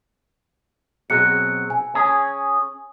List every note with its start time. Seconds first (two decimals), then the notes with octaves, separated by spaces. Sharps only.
1.10 B2 F#3 C4 G#4 F#6 C#7
1.70 G#5
1.95 C#4 G#4